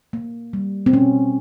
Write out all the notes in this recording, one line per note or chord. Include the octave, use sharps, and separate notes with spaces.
A#3
G3
C4
B2 C#4